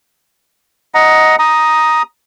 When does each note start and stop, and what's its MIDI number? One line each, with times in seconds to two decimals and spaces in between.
0.94 1.36 75
0.94 1.36 78
0.94 1.36 82
1.39 2.02 82
1.39 2.02 87